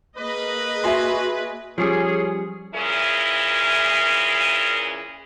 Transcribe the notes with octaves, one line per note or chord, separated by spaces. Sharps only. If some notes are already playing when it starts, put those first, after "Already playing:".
A#3 G#4 B4 D#5
F#4 E5 G#5 C6
F3 G3 C#4 G#4
A#2 E3 C#4 E4 G#4 A#4